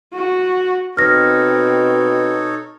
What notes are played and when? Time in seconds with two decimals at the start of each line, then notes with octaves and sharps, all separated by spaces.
0.14 F#4
0.97 B2 C4 D#4 A4 C#5 F6 A#6